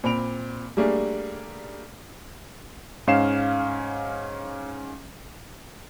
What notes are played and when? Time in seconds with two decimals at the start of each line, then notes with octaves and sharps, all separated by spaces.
0.04 A#2 C4 B5 D7 F7
0.77 G3 A3 A#3 D4 G#4 D5
3.07 G#2 C#4 F5 C7 E7